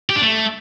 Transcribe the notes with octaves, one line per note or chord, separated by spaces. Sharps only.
G4
D4
A3